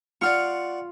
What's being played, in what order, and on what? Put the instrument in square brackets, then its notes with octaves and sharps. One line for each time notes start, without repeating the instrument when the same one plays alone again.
[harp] F4 F6 [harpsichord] D5 F#5 C#6